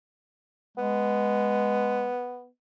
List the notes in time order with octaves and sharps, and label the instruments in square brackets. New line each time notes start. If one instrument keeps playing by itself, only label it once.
[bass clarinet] G#3 [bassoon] B3